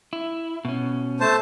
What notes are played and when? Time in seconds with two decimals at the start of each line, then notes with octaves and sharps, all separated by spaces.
0.13 E4
0.65 B2 C#4
1.20 A3 C5 A5